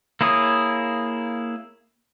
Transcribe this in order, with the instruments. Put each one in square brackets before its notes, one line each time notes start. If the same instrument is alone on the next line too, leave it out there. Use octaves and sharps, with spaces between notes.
[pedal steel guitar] A#3 E4 G#4 C#5 D#6